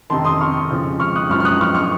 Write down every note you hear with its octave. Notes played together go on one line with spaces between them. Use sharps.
F2 C3 D#3 A5 C6
C6 D#6
C#6 F6
F2 C#3 F3
C#6 F6
D#6 F#6
F#2 F3 C#6 F6
F6
D#6 F#6
C#6 F6
C#6 F6